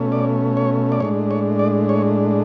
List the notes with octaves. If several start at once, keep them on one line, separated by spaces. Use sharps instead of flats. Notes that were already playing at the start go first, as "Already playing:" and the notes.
Already playing: B2 A3 C#4
D5
C#5
D5
A2 G#3 D4 C#5
C#5
D5
C#5